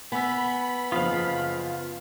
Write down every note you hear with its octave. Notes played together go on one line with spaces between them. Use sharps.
B3 G#5 B5 E6
F#1 F3 F4 F5 D#6